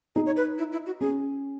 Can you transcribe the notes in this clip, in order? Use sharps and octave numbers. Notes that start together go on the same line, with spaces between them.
D#4 G#4
C#5
B4
E4
E4
F#4
C#4 G#4